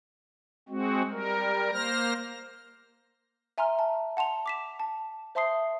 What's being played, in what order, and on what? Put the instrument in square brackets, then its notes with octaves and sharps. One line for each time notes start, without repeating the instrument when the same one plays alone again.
[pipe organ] G#3 C4 F#4
G3 A#4
A#3 C5 F6 A#6
[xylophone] E5 G#5 A#5 C6 F6
A5
F#5 A5 C6 F7
D6 B6 E7
A5
C5 E5 A5 C6 D#6 C7